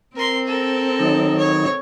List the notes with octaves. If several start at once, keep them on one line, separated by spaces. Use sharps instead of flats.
C4 A#4 C6
A4 A#4
D#3 F#3 D#4
C#5